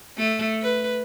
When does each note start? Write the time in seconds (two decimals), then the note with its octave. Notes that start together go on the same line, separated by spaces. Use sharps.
0.17 A3
0.62 B4